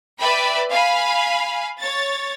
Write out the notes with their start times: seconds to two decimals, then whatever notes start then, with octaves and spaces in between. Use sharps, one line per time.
0.20 B4 D5 E5 G5 B5
0.71 F5 G#5 B5
1.79 C#5 A6